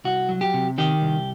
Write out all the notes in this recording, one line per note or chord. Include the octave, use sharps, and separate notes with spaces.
C2 F#4
F#3
G4
C3
D#3 G4
C2